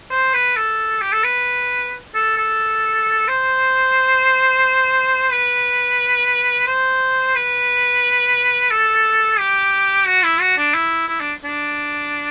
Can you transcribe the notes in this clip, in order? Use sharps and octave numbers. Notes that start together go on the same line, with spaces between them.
C5
B4
A4
G4
A4
B4
A4
A4
C5
B4
C5
B4
A4
G4
F#4
E4
F#4
D4
E4
E4
D4
D4